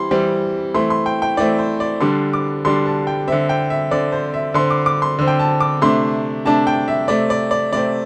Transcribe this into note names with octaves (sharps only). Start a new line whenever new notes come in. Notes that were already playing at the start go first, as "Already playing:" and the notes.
Already playing: E3 G3 C4 C6
E3 G3 C4
E3 A3 C4 C6
C6
G5
G5
E3 A3 C4 D5
C5
D5
D3 G3 D4 C6
D6
D3 G3 D4 C6
A5
G5
D3 C4 E5
G5
E5
D3 C4 D5
C5
E5
D3 C4 C6
D6
D6
C6
D3 C4
G5
A5
D6
C3 A3 D4 C6
C3 A3 D4 A5
G5
E5
C3 A3 C4 D5
D5
D5
C3 A3 C4 D5